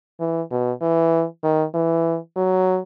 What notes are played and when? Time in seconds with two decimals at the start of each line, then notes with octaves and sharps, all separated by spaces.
0.20 E3
0.51 B2
0.81 E3
1.43 D#3
1.74 E3
2.36 F#3